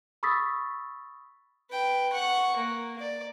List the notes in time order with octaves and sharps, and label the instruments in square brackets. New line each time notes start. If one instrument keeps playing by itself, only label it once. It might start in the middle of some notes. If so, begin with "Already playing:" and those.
[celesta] B5 C#6 D#6 E6 A6 B6
[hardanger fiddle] B4 G5
F#5 C#6
A#3
D5